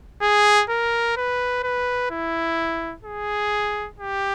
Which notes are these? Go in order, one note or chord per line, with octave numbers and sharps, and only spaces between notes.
G#4
A#4
B4
B4
E4
G#4
G4